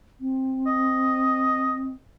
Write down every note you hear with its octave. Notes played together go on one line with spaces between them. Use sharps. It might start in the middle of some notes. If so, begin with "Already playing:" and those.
C4
D#5